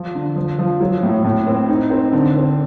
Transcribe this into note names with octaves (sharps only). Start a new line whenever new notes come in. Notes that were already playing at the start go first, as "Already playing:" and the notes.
Already playing: F3
D3
F3
F3
F#3
A2
A2
C4
D#4
C4
D3
C4